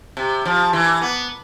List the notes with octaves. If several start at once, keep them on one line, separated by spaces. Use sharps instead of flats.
C3
F3
E3
B3